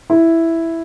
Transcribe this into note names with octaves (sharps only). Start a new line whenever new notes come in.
E4